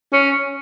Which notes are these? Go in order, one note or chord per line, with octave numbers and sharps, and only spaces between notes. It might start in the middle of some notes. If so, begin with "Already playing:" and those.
C#4